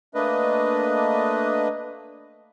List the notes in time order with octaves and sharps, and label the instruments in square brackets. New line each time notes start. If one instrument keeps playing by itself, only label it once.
[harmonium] A3 A#3 D4 B4 D#5